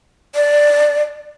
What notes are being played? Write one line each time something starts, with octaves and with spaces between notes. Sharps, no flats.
D5